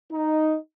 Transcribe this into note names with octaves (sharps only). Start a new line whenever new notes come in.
D#4